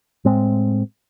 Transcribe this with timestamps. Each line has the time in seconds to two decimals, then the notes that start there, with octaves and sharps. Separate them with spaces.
0.25 A2 G#3 C4